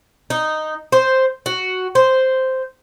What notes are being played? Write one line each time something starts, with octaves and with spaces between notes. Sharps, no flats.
D#4
C5
F#4
C5